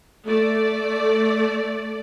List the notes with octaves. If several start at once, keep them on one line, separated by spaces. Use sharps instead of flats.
A3 D5